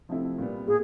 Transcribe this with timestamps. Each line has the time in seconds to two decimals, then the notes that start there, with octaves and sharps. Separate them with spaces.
0.09 C3 F3 A3 C4 E4
0.38 A#2 G3 B3
0.67 A#2 G#4